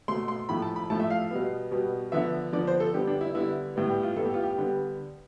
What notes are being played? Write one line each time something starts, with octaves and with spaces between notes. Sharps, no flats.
B2 A3 C6
C6
A2 F3 A3 B5
A5
B5
A2 F3 A3 A5
E5
F5
B2 G3 B3
B2 G3 B3
D3 F3 B3 E5
D3 F3 B3 D5
C5
A4
D3 G3 B3 G4
D4
E4
D3 G3 B3 E4
A2 G3 B3
G4
F4
A2 G3 B3 A4
G4
F4
G4
D3 G3 B3